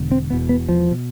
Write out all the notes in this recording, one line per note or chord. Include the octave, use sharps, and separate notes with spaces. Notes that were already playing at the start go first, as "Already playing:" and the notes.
Already playing: E1 E2 D3
C4
E1 E2 B2 B3
B3
F3
B2